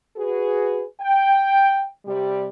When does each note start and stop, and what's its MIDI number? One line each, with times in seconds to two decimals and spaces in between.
0.17 0.83 66
0.17 0.83 68
0.17 0.83 71
1.01 1.89 79
2.06 2.49 48
2.06 2.49 55
2.06 2.49 67